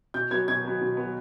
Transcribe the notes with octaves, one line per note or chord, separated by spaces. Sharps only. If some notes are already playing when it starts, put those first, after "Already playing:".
B2 G6
F#3 B3 G#6
B2 G#6
F#3 B3
B2
F#3 B3